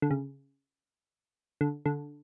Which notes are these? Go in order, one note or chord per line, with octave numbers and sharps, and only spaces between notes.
D3
C#3
D3
D3